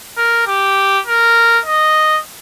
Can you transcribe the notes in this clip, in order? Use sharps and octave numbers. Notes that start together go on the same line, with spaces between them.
A#4
G4
A#4
D#5